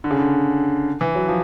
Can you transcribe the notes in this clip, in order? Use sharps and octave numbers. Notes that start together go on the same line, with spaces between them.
D3
C#3
D3
E3
F#3
F3